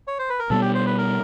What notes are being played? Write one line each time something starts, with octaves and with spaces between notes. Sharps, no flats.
C#5
C5
B4
A#4
B2 G3 B3 A4
G4
C5
B4
A#4